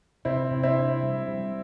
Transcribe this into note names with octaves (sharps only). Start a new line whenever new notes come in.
C3 C4 E4
C3
C4 E4
D4
G3
G3